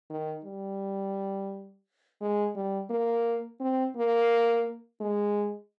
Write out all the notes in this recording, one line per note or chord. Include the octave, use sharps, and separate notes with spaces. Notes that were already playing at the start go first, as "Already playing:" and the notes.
D#3
G3
G#3
G3
A#3
C4
A#3
G#3